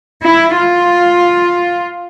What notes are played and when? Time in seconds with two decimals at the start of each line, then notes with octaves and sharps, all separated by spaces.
0.24 E4
0.56 F4